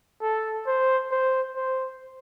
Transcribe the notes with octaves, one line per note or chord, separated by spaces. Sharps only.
A4
C5
C5
C5